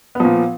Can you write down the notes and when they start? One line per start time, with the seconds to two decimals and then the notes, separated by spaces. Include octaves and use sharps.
0.15 B3
0.20 F3
0.25 A#2